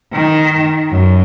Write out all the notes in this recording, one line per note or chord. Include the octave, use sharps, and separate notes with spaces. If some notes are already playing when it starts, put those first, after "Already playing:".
D#3
F#2